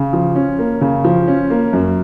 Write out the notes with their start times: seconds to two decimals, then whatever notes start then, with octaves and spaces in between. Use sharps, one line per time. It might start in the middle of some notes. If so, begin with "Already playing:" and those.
Already playing: C#3
0.13 F3
0.36 C#4
0.59 A#3
0.81 C#3
1.04 F3
1.28 C#4
1.50 A#3
1.73 F#2